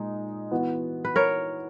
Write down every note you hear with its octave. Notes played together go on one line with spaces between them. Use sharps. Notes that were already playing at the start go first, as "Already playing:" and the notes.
Already playing: A#2 G#3 D#4
E3 B3 F#4
B4
A#4 C#5